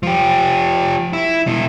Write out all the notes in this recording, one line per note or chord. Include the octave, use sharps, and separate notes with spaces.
F3 G4
E4
B2 E4